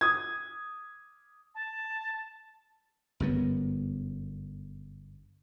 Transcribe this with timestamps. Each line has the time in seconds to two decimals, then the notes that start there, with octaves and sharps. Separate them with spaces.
0.01 D#6 G#6
1.54 A5
3.20 G1 F#2 B3